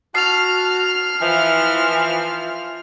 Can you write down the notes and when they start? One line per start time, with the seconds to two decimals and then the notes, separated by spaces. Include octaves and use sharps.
0.15 F#4 A5 F6 C7 F7
1.21 E3 F3 F4